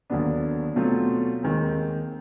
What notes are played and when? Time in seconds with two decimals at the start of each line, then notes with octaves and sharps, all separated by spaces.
0.10 D#2 D3 F#3 B3 D4
0.76 B2 F#3 A3 C4 F4
1.43 D#2 D#3 G#3 C4